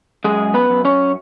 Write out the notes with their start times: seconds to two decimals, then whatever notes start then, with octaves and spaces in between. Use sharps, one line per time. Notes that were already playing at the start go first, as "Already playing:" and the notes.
0.24 F#2 G#3 G#4
0.54 B3 B4
0.70 F#2
0.85 C#4 C#5